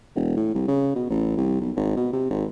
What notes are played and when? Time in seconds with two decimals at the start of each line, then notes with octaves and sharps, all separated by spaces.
0.15 E1
0.36 A2
0.54 C2
0.68 C#3
0.95 B2
1.10 A1
1.37 C2
1.60 B1
1.76 G#1
1.96 B2
2.13 C3
2.30 G#1